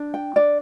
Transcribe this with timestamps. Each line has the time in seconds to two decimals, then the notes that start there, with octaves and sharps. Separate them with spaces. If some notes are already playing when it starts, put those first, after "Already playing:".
Already playing: D4
0.14 G5
0.36 D4 D5